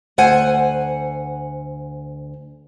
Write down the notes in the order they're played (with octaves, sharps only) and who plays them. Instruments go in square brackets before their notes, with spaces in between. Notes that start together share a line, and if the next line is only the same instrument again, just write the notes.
[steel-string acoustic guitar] D2 C5 F#5 G#5